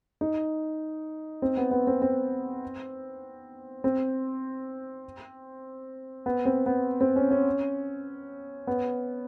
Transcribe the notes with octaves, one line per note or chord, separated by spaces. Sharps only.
D#4
C4
B3
B3
C4
C4
C4
B3
C4
B3
C4
C#4
C#4
B3